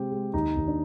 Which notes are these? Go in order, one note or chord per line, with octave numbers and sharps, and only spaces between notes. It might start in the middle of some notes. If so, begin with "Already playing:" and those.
Already playing: C3 G#3 C4 G4
G#3
D#2 D#4
D#2
D4